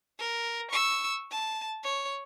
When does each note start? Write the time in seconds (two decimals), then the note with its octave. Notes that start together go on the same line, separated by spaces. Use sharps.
0.19 A#4
0.71 C#6 E6
1.31 A5
1.83 C#5